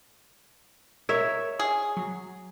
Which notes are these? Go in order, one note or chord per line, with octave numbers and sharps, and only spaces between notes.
A#4 C#5 E5
G#4
F#3